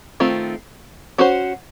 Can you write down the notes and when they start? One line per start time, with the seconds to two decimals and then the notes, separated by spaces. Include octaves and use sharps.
0.20 D#3 A3 C4 F4
1.18 C#4 F#4 C5